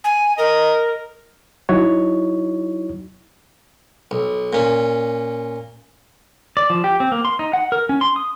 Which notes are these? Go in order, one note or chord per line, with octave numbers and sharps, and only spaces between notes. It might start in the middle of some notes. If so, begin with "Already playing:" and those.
G#5
A#4 D#5
F#3 D#4 E4 F#4 C#5
B1
A#2 C#4
D5
F3
G4
C4
A#3
C6
D#4
F#5
A#4
C#4
C6
D#6